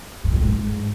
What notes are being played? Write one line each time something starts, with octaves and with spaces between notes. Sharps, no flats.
G2
A#2
F2
G#2